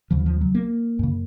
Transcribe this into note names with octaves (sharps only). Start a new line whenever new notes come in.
D#2 C#3 F3
F3
F#3
A#3
F#2 C#3